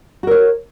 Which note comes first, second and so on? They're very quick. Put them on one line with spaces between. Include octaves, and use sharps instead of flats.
F#4 A#4 C#5